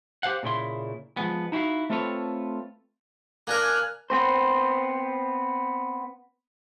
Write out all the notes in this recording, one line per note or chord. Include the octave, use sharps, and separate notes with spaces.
G4 C5 F5 F#5
A#2 C#3 E4 C6
F3 G#3 B3
D#4 E4 F#4 E5 F5
A3 C4 F4 A4 B4 C#5
A#3 D4 A#4 G#5 F6 F#6
B3 C4 C5